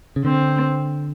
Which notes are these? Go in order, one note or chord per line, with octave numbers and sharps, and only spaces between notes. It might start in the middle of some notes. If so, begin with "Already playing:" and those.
C#3
D3 C4